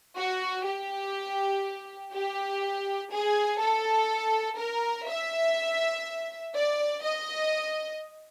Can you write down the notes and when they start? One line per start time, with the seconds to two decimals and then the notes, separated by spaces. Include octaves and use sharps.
0.17 F#4
0.66 G4
2.13 G4
3.11 G#4
3.61 A4
4.58 A#4
5.08 E5
6.55 D5
7.03 D#5